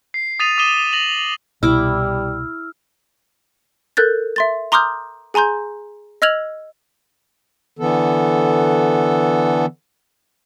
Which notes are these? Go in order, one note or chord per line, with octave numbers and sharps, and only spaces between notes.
C7
D#6 A6 B6 D#7 F7
D6 D#6 B6 D#7 E7 G7
A#6 D#7 F7 F#7
C2 B2 G3 E4 D6 E6 F6
A4 A#4 F#6 G6 A6
E5 C6 A6
A#5 C6 D6 D#6 F6 G6
G#4 G#5 A#5 C6 G6
D#5 E6 F6 G#6 F7 F#7
D3 E3 B3 A4